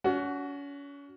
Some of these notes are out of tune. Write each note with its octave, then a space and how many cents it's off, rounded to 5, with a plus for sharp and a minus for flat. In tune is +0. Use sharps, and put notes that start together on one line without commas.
C#4 +35 F#4 +0